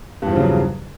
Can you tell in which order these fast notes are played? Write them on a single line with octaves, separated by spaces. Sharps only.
G2 E2 F3 C#3 F#3